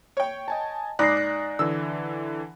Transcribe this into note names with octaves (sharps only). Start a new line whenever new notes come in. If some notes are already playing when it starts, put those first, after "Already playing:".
C#5 G5
D#5 G#5 A5
G#2 D5 B5 D6 F#6 A#6 C7
F#6
D3 E3 E6